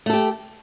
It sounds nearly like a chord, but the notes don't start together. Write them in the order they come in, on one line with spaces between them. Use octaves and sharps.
A3 A4 G4